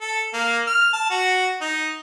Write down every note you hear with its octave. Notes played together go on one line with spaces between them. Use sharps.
A4
A#3
F6
A5
F#4
D#4